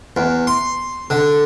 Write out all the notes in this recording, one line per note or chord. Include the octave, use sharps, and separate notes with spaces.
E2
C6
D3